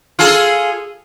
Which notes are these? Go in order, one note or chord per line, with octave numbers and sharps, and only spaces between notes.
F4 G#4 A4